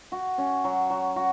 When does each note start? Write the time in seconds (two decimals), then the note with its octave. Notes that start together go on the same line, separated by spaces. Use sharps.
0.12 F#4
0.38 C#4
0.64 F#3
0.90 F#3
1.16 F#4